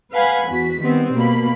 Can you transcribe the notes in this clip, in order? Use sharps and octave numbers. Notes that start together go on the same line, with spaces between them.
B4 F5 F#5 G#5 B5
E2 F#4 B6
D#3 G3 B3 C4
B2 A#3 B5